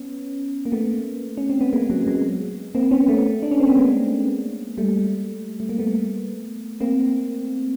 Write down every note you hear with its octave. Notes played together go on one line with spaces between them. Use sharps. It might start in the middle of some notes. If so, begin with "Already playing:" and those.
Already playing: B3 C#4
A#3
A3 B3
C#4
C4
B3
G#3 A#3
F#3 G#3
F#3 G#3
A#3 C4
B3 C#4
A3 B3
D4
C#4
C4
B3
G#3 A#3
G3 A3
A3
A#3
A3 B3
A#3 C4